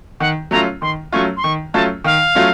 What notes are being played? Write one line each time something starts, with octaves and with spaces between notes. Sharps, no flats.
D#3 F#5
F#3 A3 C#4 F4 A#5
D#3 C6
F#3 A3 C#4 F4 C#6
C6
D#3 C#6
F#3 A3 C#4 F4 A5
D#3 F5
F#3 A3 C#4 F4